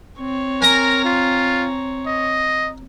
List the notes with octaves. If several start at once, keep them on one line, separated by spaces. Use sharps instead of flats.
C4 C#5
A#4 G#5 A#5
F4
D#5